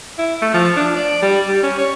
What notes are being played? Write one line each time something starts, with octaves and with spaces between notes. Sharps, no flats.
E4
A3
F3
D4
D5
G3
G3
C#4
C#5